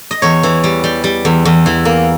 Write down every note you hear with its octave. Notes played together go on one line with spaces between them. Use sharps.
D#5
E2 C#5
E3
G3
G3
G3
E2
E2
E3
A#3